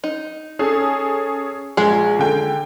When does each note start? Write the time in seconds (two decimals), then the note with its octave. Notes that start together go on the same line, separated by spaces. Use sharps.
0.04 D#4
0.59 C#4 G#4 A4
1.77 A#1 G#3 G#4
2.19 D3 G5